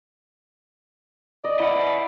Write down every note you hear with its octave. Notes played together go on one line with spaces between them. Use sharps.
D5 D#5
E4 D#5 F#5